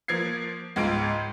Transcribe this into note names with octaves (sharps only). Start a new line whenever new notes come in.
F3 A#3 G#6 C7
C#2 G#2 F4 D7